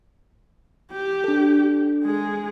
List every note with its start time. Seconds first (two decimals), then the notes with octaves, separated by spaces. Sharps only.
0.92 G4
1.24 D4 A4
2.03 G#3 G#4